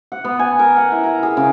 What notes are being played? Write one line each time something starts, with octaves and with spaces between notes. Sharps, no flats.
F#5
B3
G#5
A#4
F#5
E4
A#5
G#4
C#3